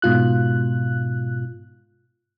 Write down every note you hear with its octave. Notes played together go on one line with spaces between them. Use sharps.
G#2 B2 F4 F#6